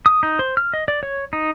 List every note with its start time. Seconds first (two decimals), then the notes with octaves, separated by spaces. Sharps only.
0.06 D#6
0.23 D#4
0.39 C5
0.57 F6
0.74 D#5
0.88 D5
1.03 C#5
1.33 D#4